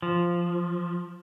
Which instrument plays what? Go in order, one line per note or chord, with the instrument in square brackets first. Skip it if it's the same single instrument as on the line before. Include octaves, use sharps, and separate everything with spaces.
[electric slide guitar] F3